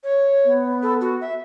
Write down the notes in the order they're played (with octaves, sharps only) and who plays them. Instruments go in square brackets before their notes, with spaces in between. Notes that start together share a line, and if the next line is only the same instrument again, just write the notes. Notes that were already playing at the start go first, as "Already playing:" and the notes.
[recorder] C#5
[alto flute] B3
[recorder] A4
F#4
E5